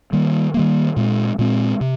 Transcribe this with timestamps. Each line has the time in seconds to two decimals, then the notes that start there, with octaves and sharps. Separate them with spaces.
0.13 D#3 G3 A#3
0.54 D#3 G3 A#3
0.96 A#2 G#3 C4
1.39 A#2 G#3 C4
1.81 C3